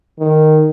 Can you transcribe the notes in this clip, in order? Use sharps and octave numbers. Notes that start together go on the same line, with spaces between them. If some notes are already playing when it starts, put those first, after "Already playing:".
D#3